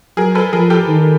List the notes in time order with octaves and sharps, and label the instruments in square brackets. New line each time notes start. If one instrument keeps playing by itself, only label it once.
[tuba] F#3 [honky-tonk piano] G#4 A#4
[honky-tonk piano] A4 B4
[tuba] F3 [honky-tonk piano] G#4 A#4
[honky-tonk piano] G4 A4
[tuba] D#3